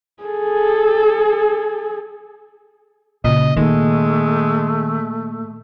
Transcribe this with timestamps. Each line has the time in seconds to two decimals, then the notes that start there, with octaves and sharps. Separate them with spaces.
0.23 G#4 A4
3.24 A#2 C#3 D#5
3.57 A#2 D#3 G#3 A3